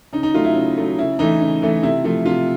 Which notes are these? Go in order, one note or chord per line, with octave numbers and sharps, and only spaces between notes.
C#3 D#4
D#4
F#3 A3 F4
E4
C#3
F#3 A3
C#3 E4
E3 A3 D#4
C#3
E3 A3
C3 E4
F3 A3
C3 F4